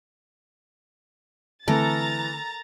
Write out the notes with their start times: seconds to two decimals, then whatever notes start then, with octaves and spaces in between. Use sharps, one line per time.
1.68 D3 E3 A3 C4 A4 A#4 A#5 A6